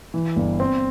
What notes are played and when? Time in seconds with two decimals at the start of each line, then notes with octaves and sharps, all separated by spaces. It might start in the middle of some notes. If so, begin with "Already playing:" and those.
0.14 E3
0.36 G1
0.60 C4